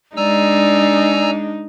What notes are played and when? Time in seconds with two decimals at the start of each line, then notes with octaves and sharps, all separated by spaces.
0.17 G#3 D4 D#4 D5 G#5 A#5 E6